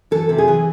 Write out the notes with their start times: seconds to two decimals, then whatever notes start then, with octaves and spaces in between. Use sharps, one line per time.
0.11 E3 A4
0.29 C3 A4
0.38 G#4
0.48 E3